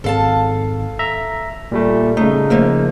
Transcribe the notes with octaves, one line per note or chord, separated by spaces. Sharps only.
G#1 A4 F5 A5
E5 A#5
A#2 G3 A3
C#3 A3 D#4
F3 A3 A#3